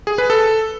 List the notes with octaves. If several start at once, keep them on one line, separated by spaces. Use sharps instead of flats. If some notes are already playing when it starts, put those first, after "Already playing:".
G#4
B4
A4